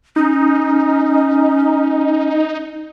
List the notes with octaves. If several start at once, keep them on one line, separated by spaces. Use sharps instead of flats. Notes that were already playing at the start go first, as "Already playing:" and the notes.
C#4 D#4